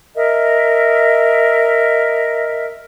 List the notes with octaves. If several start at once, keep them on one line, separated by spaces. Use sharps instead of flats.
A#4 D#5 E5